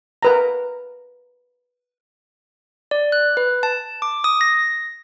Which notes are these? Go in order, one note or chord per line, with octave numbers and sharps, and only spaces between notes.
A#4 B4 A#5
D5
F#6
B4
A5
D6
D#6
A#6